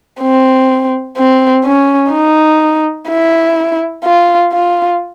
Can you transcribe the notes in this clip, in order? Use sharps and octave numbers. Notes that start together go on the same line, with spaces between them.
C4
C4
C#4
D#4
E4
F4
F4